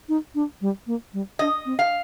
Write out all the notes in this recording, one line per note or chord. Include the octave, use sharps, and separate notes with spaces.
D#4
D4
G3
A#3
G3
D4 D#5
C4
F5